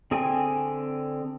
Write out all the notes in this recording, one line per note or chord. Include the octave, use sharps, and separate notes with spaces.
D3 C4 G#4 G5 G#5